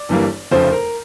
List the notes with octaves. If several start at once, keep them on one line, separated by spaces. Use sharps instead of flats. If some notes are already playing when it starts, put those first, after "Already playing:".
Already playing: D5
G1 G2 E3 G3 A#3
F1 F2 C#3 F3 A3 C5
A#4